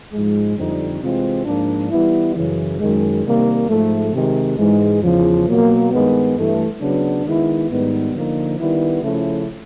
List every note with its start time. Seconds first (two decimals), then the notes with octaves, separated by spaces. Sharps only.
0.12 G#2 F3 G#3
0.57 F2 D3 G3 C4 D#4
1.01 C3 E3 G#3 C4 F4
1.45 G#2 F3 A#3 D4
1.90 E3 G3 B3 E4
2.35 F#2 C#3 E3
2.79 F#2 D#3 G#3
3.24 C3 D#3 G3 A#3
3.68 G#2 F3 A3
4.12 C3 D#3 G#3
4.57 G#2 E3 G#3
5.01 E2 C#3 F3
5.46 B2 F#3 A#3
5.90 G2 D#3 G#3 B3
6.35 G2 E3 A3
6.79 C#3 F#3 B3 D4
7.24 D#3 G#3 B3 E4
7.68 G#2 D#3 G3 B3 D#4
8.12 D3 F3 A#3 D#4
8.58 D#3 G3 B3 E4
9.02 C#3 F3 A3 C#4 E4